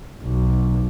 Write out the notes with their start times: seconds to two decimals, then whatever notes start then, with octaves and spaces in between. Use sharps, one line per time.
0.23 B1